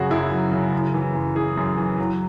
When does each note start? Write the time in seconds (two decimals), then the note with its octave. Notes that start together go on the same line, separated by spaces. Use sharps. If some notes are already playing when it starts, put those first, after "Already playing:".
Already playing: F#2 C#3 F#3 F#4 G#4
0.10 F#2 E4
0.31 F#3
0.52 C#3
0.72 F#2
0.94 E3
1.14 F#2
1.36 E3 G#4
1.57 F#2
1.78 E3
1.98 F#3